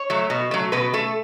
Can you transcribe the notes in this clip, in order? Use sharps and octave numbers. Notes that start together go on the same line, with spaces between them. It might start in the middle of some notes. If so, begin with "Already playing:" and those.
Already playing: C#5
F#3 A3
B2
F#3 A3
B2 B4
A3 A4